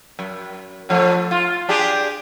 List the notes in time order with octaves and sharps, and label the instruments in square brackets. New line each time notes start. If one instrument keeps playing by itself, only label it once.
[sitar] F#2
D3 F3 A3
F4
D4 G4 G#4